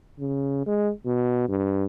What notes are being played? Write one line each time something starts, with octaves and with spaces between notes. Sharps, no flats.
C#3
G#3
B2
G2